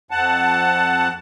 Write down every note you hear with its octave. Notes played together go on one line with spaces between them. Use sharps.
F2 F#5 A5